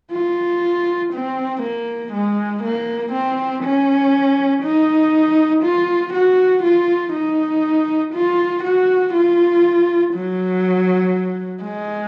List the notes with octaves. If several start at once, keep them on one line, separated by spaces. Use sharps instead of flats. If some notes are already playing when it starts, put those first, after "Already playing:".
F4
C4
A#3
G#3
A#3
C4
C#4
D#4
F4
F#4
F4
D#4
F4
F#4
F4
F#3
G#3